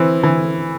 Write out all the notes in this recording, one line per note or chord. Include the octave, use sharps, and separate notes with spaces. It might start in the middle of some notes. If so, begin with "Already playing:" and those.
Already playing: E3 C4
E3